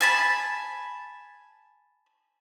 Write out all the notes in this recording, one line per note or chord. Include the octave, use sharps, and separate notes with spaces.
G#5 A5 B5